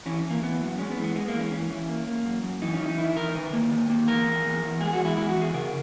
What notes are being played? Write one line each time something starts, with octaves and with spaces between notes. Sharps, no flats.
E3 C#4
E3
A#3
E3 B3
F#2
G#3 C#4
B3
E3
B3
G#3 B3
A#3
E3
C#4
E3 C#4
E3
A#3
A#3
F#2
F#2
E3 D#4
C#4
E3
D#4
D#3 E4
E2 A#4
D#3 B4
A#3
D#3
A#3
E2 A#4
E2
E2
E2
G#3 G#4
F#4
E2
E4
E2 E4
F#4
E2
G#4
C#3 A#4